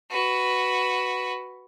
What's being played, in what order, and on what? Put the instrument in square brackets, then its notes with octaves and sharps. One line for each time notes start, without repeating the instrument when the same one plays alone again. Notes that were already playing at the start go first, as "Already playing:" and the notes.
[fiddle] F#4 B4